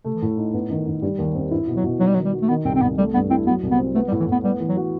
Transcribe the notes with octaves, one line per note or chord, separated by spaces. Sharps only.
C3 A3
E3
A2 D#3
D#4
G2 B3
F#2 D#3
F#2 D#3
G2 G3
D#2
F#2 C4
G2 E4
B2
F#3
B2
F#3 D#4
G3
F#3
D#3
G3
F#4
A3
D#3 B3
C2 C4
C4
C2 B3
G3 A3
G2 B3
C4 E4
F#3 B3
C2
B3
C4
A3 B3
G3
A2
E3
A2 B3
G3 B3
E3
F#3
F#4